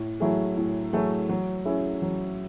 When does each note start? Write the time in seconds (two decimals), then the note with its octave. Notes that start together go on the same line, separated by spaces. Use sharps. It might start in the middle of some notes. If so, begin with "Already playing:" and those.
Already playing: A2
0.20 F#3 A3 E4 G#4
0.57 A2
0.93 F#3 A3 E4 G#4
1.29 F#3
1.65 C#4 E4 G#4
2.02 F#3